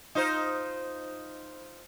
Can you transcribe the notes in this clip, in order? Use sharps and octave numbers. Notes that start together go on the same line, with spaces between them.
D#4 F4 C5